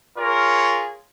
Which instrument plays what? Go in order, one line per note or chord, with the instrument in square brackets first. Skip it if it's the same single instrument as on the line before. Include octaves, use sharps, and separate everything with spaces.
[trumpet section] F4 G#4 A#4 C#5